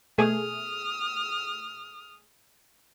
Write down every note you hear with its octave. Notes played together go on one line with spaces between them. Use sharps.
B2 A3 G#4 D#6 F6